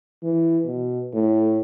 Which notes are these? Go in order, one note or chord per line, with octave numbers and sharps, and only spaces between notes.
E3
B2
A2